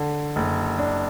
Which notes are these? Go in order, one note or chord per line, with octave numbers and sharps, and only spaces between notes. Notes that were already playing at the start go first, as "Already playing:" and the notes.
Already playing: D3
F#1
D4